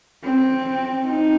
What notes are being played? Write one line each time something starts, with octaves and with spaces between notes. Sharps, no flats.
C4
D#4